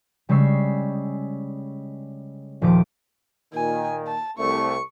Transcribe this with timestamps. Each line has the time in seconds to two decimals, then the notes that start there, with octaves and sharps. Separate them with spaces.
0.29 C#3 G3 G#3 C#6 E6 C7
2.62 D#1 D#2 F3 D6 D7
3.54 A#2 D#3 G#5
4.07 A5
4.38 C2 A3 C#6